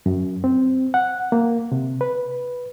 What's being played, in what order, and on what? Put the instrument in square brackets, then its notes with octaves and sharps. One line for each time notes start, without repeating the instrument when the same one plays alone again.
[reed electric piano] F#2
C4
F#5
A#3
C3
B4